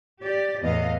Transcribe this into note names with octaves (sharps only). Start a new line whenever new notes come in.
G4 D5
E2 A2 B3 D#5 F5